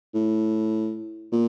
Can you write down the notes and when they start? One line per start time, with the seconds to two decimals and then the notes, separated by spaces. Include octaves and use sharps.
0.14 A2
1.32 A#2